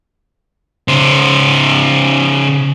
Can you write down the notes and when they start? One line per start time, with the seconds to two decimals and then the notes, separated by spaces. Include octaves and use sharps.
0.88 C#3 C5